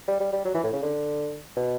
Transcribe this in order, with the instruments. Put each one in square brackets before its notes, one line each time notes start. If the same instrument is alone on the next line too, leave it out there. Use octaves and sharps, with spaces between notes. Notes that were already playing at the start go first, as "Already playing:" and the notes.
[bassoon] G3
G3
G3
F#3
E3
A2
C#3
D3
B2